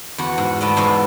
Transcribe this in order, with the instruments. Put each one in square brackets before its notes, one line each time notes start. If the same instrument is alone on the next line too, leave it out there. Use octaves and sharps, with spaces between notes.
[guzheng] E2 F#4 F#5
G#2
A3 B3 D5 D#5
E2 G#2 G#3 B3 F5